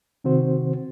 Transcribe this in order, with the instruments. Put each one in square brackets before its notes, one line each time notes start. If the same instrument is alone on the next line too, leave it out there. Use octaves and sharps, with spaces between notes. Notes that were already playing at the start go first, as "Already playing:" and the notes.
[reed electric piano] C3 D#3 C4 F#4 C5